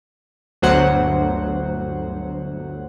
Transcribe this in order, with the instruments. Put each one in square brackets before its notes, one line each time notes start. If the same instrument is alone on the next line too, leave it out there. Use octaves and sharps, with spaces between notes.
[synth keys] G1 D2 F#3 C5 F#5